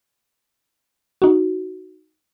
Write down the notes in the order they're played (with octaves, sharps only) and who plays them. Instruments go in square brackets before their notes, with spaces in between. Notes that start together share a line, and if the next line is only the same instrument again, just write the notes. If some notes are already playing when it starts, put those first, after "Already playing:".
[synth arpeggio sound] D#4 F#4